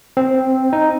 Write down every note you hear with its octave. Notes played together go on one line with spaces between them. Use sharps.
C4
D#4